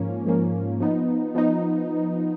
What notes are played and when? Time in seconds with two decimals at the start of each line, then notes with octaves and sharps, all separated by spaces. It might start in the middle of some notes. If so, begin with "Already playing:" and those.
Already playing: G#2 F3 A#3 C#4
0.26 G#2 F3 A#3 C#4
0.80 F3 B3 D#4
1.35 F3 B3 D#4